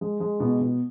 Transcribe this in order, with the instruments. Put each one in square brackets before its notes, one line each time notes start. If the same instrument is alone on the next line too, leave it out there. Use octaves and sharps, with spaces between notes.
[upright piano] G#3
G#3
B2
B2